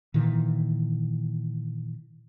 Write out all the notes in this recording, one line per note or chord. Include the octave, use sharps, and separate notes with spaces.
A#2 D#3 E3